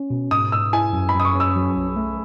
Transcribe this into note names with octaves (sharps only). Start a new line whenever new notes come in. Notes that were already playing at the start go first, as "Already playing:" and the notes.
Already playing: C#4
B2
G#2 D#6
G#2 E6
E4 G#5
F#2
B5
F#2
D#6
C#6
C#4
E6
F#3
B1
A3